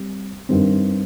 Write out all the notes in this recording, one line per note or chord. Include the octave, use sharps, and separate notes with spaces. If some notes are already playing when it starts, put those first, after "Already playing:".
Already playing: G3 C4
G2 D#3 G3 C4